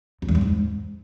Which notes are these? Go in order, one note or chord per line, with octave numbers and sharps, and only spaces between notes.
F2
E2
G2
G#2